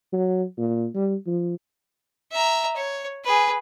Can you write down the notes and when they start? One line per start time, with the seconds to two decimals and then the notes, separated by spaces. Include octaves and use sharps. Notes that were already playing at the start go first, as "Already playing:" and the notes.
0.13 F#3
0.57 A#2
0.94 G3
1.26 F3
2.32 E5 A#5
2.76 C#5
3.24 G#4 B4